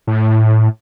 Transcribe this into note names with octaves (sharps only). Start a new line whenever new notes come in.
A2